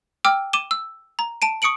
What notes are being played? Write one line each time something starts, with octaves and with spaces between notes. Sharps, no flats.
G5 D6 E6 F6
D6 D#7 E7 G7
E6
A#5
A5 D7 D#7
C#6 D#6 C#7 D7 F#7